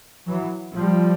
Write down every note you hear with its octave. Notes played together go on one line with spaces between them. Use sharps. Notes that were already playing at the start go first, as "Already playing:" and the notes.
E3 F#3
F3 G3